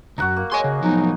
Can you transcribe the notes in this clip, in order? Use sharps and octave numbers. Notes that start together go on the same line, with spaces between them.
C#2 F#2 F#4 F#5 A#5
A#3
G#4 C#5 D#5 G#5 C6
C#3
A2 F3 F#3 B3 D#4